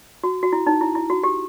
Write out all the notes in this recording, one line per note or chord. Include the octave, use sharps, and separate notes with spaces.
F#4
F#4
E4
D#4
E4
E4
F#4
G4